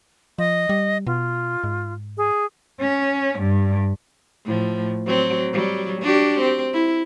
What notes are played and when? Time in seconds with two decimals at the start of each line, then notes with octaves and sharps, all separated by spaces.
0.38 F3 D#5
0.69 G3
1.07 B2 F4
1.64 G#2
2.17 G#4
2.81 C#4
3.39 G2
4.45 A2 F3
5.06 F#3 C4
5.52 F#3 G3
6.02 D4 F#4 G4
6.40 C4
6.73 E4